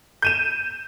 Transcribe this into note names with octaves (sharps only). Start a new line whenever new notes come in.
G6 D#7 E7